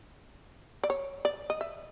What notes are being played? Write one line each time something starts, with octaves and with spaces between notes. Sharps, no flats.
D5
C#5
D5
D#5
E5